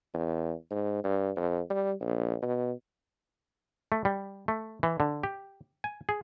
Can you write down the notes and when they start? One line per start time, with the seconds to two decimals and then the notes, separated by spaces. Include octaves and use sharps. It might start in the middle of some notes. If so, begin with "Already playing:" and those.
0.14 E2
0.71 G#2
1.04 G2
1.36 F2
1.70 G3
2.01 A#1
2.42 B2
3.92 A3
4.05 G3
4.48 A3
4.83 E3
5.00 D3
5.23 G4
5.84 G#5
6.09 G#4